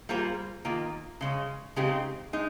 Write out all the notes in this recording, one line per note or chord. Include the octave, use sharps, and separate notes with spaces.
G3 A#3 F4 G#4 C5
D#3 A#3 F4
C#3 G#3 C#4
C#3 G#3 C4 D#4 G4
G#3 D#4